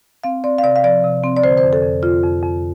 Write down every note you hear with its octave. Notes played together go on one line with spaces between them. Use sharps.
C4 F5
C4 D5
F5
C3 D5
F5
F3 D5
C3
C4
D5
D3 C5
C5
F2
A4
F2
F2 F4
F2
F2